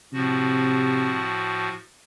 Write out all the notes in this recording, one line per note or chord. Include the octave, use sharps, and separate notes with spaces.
A2 C3 F3 F#4